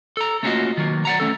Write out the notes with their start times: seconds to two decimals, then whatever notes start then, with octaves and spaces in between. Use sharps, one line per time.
0.17 A4 A#5
0.43 A3 A#3 C#4 F4 F#4 D#5
0.77 D#3 F#3 A#3
1.05 D5 F#5 A#5
1.20 A3 C#4 A4